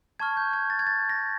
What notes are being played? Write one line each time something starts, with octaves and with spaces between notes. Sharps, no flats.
A5 C#6 F6 G#6
G6
G#6
A6
G#6
A6
A#6